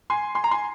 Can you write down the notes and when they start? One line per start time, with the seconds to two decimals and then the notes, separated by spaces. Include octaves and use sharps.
0.10 G#5 C6
0.35 G#5 C6
0.44 A#5
0.51 G#5 C6